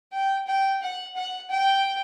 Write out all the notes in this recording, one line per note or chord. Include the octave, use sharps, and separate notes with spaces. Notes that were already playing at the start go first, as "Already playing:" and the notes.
G5
G5
F#5
F#5
G5